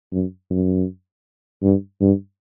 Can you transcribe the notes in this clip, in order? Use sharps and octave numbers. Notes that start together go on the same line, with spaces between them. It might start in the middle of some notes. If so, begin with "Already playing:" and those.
F#2
F#2
G2
G2